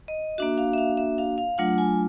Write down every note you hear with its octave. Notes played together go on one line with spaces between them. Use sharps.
D#5
A#3 D4 F#4 E5
F5
E5
F5
E5
F5
F5
F#3 A3 D4 F4 F#5
G#5